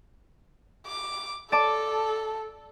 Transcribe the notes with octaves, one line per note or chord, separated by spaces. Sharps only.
D6
A4 D5 A5 D6